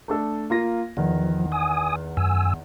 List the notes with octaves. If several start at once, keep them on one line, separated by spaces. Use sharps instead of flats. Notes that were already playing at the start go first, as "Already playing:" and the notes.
A3 D4 A4
A#3 F4 A#6
E2 D#3 F3
G#5 D#6
F#2 G#5 E6